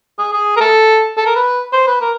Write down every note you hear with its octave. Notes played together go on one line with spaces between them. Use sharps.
G#4
G#4
A#4
A4
A4
A#4
B4
C5
B4
A#4